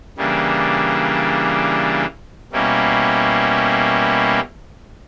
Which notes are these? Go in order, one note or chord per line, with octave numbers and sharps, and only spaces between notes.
C#3 E3 G3 A#3 D4
B2 G3 A#3 C#4 E4